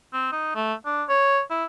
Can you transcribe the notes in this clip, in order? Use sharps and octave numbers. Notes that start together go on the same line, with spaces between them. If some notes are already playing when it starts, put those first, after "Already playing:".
C4
D#4
A3
D4
C#5
E4